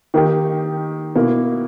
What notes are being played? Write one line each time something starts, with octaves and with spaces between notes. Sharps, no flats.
D#3 A#3 D#4 G4
B2 A#3 E4